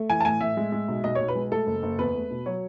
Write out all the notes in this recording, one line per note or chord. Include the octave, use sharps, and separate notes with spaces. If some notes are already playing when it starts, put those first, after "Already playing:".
Already playing: A3
E3 G#5
A5
A2 G#5
A2 E5
G#3
G#3
B1
B1 D#5
C#5
B1
B4
G#3
A3 A4
F#1
F#1
E2 B4
A3
B2
F#3 C#5